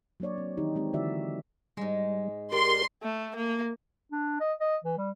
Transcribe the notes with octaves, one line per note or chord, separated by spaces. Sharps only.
F#3 A#3 D4 C#5 D5
C4
D#3 E3 D#4 G4
G#3 C4 G4
D3 E3 E4 F#4 D5 E5
G#2 G3 G#3
G4 A#4 D5 C6
A3
A#3
D4
D#5
D#5
E3
G3